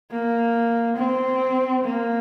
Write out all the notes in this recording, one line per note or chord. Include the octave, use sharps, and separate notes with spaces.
A#3
C4
A#3